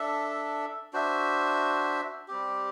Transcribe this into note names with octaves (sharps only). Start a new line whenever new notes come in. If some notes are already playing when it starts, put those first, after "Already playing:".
Already playing: D4 A4 E5
D4 F#4 C5 E5
G3 C4 G4